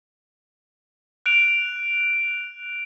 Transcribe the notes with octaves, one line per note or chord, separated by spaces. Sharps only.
F#6 D7 F7